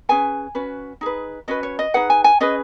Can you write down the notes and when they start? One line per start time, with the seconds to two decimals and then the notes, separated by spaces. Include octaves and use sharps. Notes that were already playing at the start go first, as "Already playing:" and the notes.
0.09 C#4 G#4 B4 G#5
0.55 C#4 F#4 B4
1.01 D#4 G#4 B4
1.48 C#4 F#4 B4 D#5
1.63 C#5
1.79 D#5
1.94 D#4 G#4 B4 F#5
2.10 G#5
2.24 G#5
2.40 C#4 G#4 B4 D#5